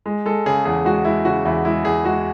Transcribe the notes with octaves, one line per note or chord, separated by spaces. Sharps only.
G#3
G#3 A4
C#3 G#4
E2 G#4
G#3 F#4
G#3 E4
C#3 F#4
E2 E4
G#3 E4
E2 G#4
G#3 F#4